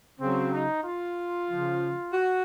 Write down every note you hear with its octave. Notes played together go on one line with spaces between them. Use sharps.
C#3 F#3 C4
D#4
F4
C#3 F3
F#4